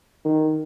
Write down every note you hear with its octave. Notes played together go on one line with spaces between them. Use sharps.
D#3